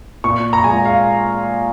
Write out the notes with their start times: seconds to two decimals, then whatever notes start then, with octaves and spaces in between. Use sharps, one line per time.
0.24 A#2 C#6
0.53 A#5
0.64 G#3 G#5
0.70 F4
0.86 F5